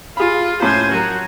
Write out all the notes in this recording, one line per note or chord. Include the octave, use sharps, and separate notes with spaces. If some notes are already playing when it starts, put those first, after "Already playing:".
F4 G#4 B5
A2 C#4 C5 G#5
F#3 F#4 A#4 A#5